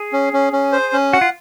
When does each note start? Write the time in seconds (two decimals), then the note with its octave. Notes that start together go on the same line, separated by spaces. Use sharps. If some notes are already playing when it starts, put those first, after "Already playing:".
Already playing: G#4
0.13 C#4
0.33 C#4
0.53 C#4
0.72 C5
0.93 C#4
1.13 F#4 F#5
1.21 F4